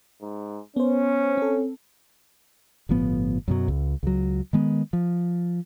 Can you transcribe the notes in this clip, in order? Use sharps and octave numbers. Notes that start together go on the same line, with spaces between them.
G#2
B3 C#4 C5
C4 A4
G1 A2 F3 B3
F#2 B2 F#3
C#2
C#2 F#3
D#3 G#3 B3
F3